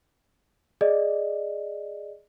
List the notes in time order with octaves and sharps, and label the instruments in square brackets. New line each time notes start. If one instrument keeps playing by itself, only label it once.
[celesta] G#4 D5 D#5